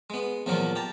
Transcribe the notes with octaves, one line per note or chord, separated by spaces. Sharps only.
G#3 B3
E2 A#2 F3 F#3 A#3
G4 A5 A#5